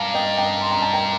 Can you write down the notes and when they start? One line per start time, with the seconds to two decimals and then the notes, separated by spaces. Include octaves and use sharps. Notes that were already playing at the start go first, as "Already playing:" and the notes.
Already playing: G2 F5 A5 A#5
0.14 D#5 G5
0.38 G5 A#5
0.61 C6
0.72 A#5
0.82 A5
0.94 G5 A#5